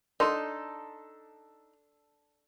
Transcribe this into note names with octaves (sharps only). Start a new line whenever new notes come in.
D4 D#4 A4 C6